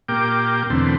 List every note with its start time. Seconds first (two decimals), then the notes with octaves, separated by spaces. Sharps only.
0.09 A#2 A#3 G4 G5 D6
0.70 E2 B2 D3 A3 C4